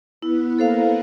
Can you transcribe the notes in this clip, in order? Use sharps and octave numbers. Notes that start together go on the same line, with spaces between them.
B3 E4 B4
A#3 A4 A#4 C5 F5